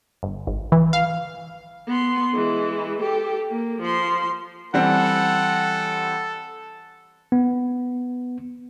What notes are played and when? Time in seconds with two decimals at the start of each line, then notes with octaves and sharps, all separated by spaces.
0.23 G1
0.47 G#1
0.72 E3
0.93 F5
1.88 B3 C6
2.34 E3 G#3
3.02 G4 A4
3.48 A#3
3.82 F3 C6
4.74 E3 G3 C4 A4 F#5
7.32 B3